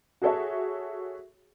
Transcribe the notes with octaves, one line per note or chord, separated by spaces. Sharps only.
F#4 G#4 A4 C#5 E5